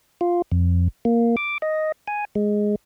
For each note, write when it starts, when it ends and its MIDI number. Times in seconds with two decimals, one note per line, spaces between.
0.21 0.42 65
0.52 0.88 41
1.05 1.36 58
1.37 1.58 86
1.62 1.92 75
2.08 2.25 80
2.35 2.76 56